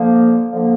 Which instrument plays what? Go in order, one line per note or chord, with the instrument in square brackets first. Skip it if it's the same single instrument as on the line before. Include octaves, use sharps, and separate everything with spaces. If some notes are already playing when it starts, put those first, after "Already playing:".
Already playing: [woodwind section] D3 F3 A#3
D3 F3 A#3